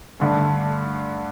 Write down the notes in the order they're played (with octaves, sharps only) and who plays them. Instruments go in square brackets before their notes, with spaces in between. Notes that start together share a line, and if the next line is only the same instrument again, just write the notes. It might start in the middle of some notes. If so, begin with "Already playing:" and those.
[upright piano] G2 D3 A3